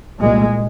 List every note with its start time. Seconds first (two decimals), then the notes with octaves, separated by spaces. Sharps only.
0.21 C2 A#2 G#3